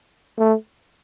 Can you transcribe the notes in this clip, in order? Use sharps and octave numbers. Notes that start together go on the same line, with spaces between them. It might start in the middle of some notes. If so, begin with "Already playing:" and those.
A3